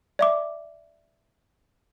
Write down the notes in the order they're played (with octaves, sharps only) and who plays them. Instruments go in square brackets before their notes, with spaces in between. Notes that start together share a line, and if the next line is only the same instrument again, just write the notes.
[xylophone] D5 E5 D6